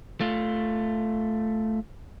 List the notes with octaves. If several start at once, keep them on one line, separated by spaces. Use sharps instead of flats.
A3 F4